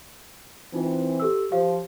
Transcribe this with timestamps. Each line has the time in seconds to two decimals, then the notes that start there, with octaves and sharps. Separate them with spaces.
0.74 E3 C4 D#4 F4
1.20 G4 A4 E6
1.52 F3 G4 C#5 F5